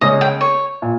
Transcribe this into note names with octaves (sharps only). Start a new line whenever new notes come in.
C#2 C#3 G#3 C#4 D#5
G5
C#5
A#2